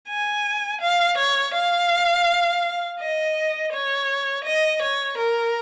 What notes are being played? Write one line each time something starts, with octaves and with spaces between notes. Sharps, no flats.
G#5
F5
C#5
F5
D#5
C#5
D#5
C#5
A#4